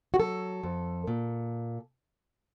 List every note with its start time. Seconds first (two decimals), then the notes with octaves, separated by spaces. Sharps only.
0.14 F#4
0.19 F#3 A4
0.63 F2
1.08 A#2